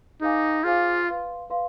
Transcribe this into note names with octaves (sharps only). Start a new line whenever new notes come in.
D#4 G#4 C5 F5 G#5 D6
F4 G#4 C5 F5 G#5 D6
B4 F5 C6
B4 F5 C6